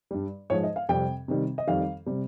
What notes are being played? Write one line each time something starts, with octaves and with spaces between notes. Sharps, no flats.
G2 G3
G#2 F3 G#3 C#5
D#5
F5
F2 C3 G3 G5
C3 D#3 G3
D#5
F2 D#3 G3 F5
C3 G3